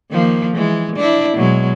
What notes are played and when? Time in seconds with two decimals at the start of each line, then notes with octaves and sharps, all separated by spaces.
0.10 D#3 F3 A#3
0.53 E3 G#3
0.96 D4 E4
1.35 B2 F#3 G#3